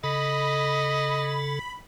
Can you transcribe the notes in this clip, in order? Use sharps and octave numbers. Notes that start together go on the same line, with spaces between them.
C#3 A4 D#5 B5